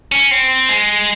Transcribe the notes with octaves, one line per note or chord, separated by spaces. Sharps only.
C#4
C4
G#3